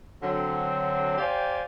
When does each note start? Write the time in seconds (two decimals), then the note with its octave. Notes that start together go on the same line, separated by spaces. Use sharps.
0.23 D3 F#3 C4
1.18 G4 C5 D5 F5 G5 G#5